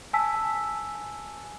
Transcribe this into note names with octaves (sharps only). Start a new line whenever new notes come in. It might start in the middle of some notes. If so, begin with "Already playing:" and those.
G#5 A5 E6 B6